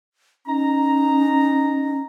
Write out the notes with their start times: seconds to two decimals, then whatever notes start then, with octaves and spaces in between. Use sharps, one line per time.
0.47 C#4 D#4 A#5